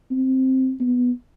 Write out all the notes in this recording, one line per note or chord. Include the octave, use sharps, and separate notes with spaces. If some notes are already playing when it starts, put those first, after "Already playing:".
C4
B3